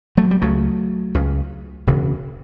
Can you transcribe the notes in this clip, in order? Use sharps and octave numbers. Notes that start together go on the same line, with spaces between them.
F#3 A3
G3
C#2 C#3 F#3 A3
C#2 C#3
E1 D2 C#3